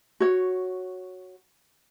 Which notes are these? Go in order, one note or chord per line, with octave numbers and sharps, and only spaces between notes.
F#4 C#5